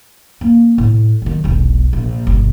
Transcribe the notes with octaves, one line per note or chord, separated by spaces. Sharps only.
A#3 C#4
A2
D#3 F#3
E1 B1
A#1
G1 B2